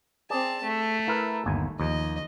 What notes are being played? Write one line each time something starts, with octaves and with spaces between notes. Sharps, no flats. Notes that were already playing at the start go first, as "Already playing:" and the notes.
C4 G#4 D5 A5
A3
E4 A#4 B4
G1 D#2 G#5
D#2 F3 D#5